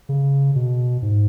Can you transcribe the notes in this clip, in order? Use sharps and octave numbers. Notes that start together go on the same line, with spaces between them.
C#3
B2
G#2